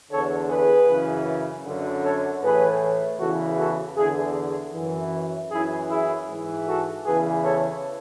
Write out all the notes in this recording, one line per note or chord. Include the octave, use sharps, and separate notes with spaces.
E2 D3 A4 C#5
G#4 B4
F#2 C#3 E3
F#2 D3
A4 C#5
A2 E3 G#4 B4
E2 C#3 E3 F#4 A4
F#4 A4
E2 D3 E4 G#4
F#2 E3
F#2 E3 E4 G#4
E4 G#4
G#2 E3
F#4 A4
E2 C#3 E3 G#4 B4
A4 C#5